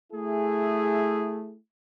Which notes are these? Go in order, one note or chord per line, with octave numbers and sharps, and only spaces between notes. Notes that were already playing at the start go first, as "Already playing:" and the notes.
A3 E4 G#4